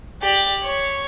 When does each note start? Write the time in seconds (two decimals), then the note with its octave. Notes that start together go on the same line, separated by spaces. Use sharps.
0.22 G4 D5
0.63 C#5